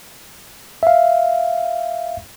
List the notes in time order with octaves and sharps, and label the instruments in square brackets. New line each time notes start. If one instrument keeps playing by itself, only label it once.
[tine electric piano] E5 F5